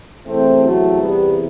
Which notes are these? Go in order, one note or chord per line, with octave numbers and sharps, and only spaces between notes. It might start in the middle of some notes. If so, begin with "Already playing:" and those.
E2 C3 E3 A3 C4
F#3 A3
G3 B3